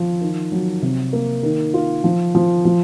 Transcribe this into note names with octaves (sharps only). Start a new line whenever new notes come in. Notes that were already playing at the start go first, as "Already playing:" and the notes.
Already playing: F3
D#3
F#3
C3
A#3
D#3
F4
F3
F3
F3